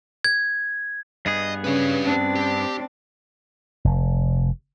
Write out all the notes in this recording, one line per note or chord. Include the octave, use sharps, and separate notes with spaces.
G#6
G2 B3 G#4 D#5
C#3 G3 C#4 B4
C4 D4
G4
F1